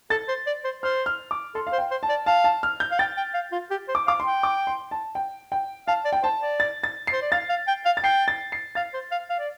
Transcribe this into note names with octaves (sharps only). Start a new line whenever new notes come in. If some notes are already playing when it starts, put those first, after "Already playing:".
A4 A6
C5
D5
C5
C5 F6
F6
D6
A4 C6
F5
C5
G5
C5
A5
D5
F5 A5
A5
F6
G6
F5
G5 A6
G5
F5
F4
G4
C5
D6
F5 D6
C6
G5
D6
C6
A5
G5
G5
F5 A5
D5
G5
C5 A5
D5
A6
A6
C7
C5
D5
F5 A6
F5
G5
F5
A6
G5 C7
A6
C7
F5 A6
C5
F5
F5
D5